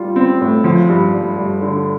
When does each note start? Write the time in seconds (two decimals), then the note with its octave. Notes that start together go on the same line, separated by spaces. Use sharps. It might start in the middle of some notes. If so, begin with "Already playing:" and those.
Already playing: G3 F4
0.16 C4
0.41 A2
0.64 F3
0.89 G2
1.13 G2
1.37 G2
1.61 D3